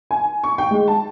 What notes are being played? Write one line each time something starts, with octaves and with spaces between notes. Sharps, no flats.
G#5
C#6
G5
G#3
A5